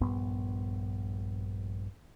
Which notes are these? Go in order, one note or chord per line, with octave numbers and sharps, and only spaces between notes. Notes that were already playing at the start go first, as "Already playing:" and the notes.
A#1 G2 B3